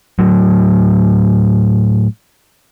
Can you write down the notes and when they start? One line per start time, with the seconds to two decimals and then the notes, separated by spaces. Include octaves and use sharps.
0.19 A2 F#3